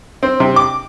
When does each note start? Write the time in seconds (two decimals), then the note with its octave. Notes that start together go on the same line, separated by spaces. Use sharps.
0.23 C4
0.40 C3
0.56 D6